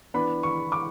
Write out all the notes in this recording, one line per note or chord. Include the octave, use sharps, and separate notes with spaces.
E3 B3 D4 B5
C#6
D6